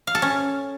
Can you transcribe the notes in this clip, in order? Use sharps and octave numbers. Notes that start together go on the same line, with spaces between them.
F5
A4
C#4